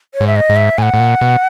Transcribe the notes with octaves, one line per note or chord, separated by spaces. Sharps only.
C#5
G#2
E5
D#5
G#2
E5
A2 F#5 G#5
A2
A#2
B2